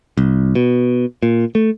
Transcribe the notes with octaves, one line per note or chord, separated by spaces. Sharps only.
C2
B2
A#2
A3